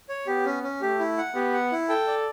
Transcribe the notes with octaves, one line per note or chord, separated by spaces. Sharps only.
C#5
B3 G4
C#4
C#4
A3 G4
E4
F#5
B3 G4
F#5
E4
A4 G5
D5